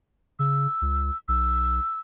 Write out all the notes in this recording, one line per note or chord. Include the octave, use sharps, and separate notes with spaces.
C#3 E6
C#2
B1 E6